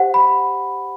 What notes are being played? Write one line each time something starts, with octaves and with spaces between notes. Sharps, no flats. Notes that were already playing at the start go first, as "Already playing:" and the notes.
Already playing: G4 C5 F#5
B5